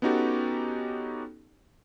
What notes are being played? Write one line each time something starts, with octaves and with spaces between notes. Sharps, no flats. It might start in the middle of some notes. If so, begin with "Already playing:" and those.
B3 C#4 D#4 F#4 G4 A4